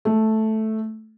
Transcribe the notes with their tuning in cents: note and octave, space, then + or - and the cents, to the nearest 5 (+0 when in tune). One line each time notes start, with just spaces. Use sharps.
A3 -5